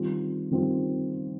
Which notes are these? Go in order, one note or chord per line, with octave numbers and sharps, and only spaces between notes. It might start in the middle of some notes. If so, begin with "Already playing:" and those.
Already playing: D#3 G3 C4 F4
D#3 G3 C4 F4